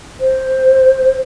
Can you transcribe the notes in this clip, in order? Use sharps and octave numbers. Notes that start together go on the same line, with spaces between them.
C5